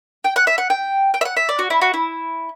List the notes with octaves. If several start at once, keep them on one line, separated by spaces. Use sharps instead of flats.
G5
F#5
E5
F#5
G5
G5
E5
F#5
E5
D5
F#4
E4
F#4
E4